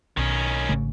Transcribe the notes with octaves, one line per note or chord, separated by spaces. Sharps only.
B1 D#3 C#4
G#1 C#3 A3